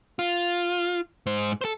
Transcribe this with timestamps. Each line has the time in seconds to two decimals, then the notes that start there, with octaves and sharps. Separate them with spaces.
0.19 F4
1.26 G#2 C5
1.61 A4 C5